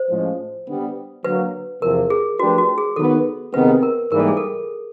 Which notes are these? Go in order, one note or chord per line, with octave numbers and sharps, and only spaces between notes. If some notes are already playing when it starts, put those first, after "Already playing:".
Already playing: C5
A2 F3 G#3 C#4
D3 G3 B3
D3 F#3 A#3 B4
E2 C3 F3 A#4
G#4
F3 A3 D4 F#4 G4 B4
F#4
G#4
D#3 F#3 B3 A4
C3 D#3 G#3 B3 B4
A#4
G#2 E3 G3 A#3 A#4
A4
G#4
A4